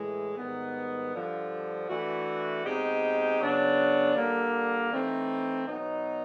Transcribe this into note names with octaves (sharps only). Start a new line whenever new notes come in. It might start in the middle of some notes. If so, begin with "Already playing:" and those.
Already playing: A2 E3 G#3
G#2 D#3 G3 B3
G2 D3 F3
E3 A3 D4 F#4
B2 G#3 C4 D#4 G4
C#3 F#3 B3 D4
D3 G3 A#3
E3 A3 C4 D#4
B2 F#3 B3 D#4